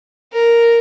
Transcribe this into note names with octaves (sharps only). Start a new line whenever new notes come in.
A#4